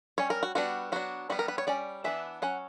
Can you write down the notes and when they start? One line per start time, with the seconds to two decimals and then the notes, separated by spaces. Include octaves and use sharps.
0.18 G3 C#4 C#5
0.30 A#4
0.43 F#4
0.55 G3 B3 D4 F#4
0.92 F#3 B3 D4 F#4
1.30 G3 B3 D4 F#4
1.39 A#4
1.48 B4
1.58 C#5
1.67 G3 C#4 D5
2.04 E3 B3 D4 E5
2.42 F#3 C#4 F#5